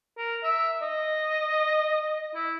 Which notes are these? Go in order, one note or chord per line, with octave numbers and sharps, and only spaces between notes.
A#4
E5
D#5
E4